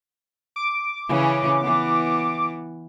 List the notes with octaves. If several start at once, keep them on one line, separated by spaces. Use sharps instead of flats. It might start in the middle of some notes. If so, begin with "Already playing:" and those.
D6
C#3 E3 C#4
E3 B3